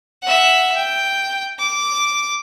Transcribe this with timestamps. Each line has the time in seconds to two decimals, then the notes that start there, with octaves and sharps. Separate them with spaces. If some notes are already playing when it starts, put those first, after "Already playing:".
0.23 E5 F#5
0.76 G5
1.59 D6